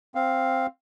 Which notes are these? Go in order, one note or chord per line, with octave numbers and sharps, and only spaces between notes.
C4 F5